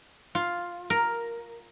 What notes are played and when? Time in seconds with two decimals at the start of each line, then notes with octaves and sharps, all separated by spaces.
0.35 F4
0.90 A#4